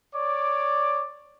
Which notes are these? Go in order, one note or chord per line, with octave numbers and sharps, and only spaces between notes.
C#5 D5 D6